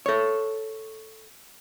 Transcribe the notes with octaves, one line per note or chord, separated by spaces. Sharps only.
A4 C#5